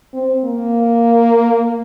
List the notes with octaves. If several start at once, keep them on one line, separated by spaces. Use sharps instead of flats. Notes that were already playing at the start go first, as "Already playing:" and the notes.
C4
A#3